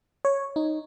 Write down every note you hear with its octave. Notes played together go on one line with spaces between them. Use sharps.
C#5
D#4